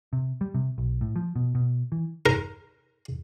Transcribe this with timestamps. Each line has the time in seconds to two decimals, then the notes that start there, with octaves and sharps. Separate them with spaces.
0.13 C3
0.41 G3
0.54 C3
0.78 B1
1.01 A2
1.16 F3
1.36 B2
1.55 B2
1.92 E3
2.26 A#4